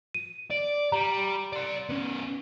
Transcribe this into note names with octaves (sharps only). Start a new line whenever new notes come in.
D#7
D5
G3 A#5
D5 C6
B3 C#4